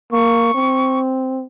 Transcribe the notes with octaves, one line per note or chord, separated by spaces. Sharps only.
A#3 C#6
C4